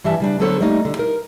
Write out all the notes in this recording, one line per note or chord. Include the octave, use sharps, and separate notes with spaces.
G2 E3 G4 E5 A5
C#3 G3 D4
D3 F#3 B3 A4 C5 C#5
G3 A3 A#3 D#4
D3
D#4 A#4